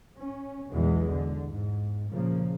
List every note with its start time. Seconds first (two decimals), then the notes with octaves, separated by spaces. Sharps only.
0.20 C#4
0.73 B1 E2 B2 E3 G#3
1.10 D3
1.51 G#2
2.10 A#2 C#3 F3 A#3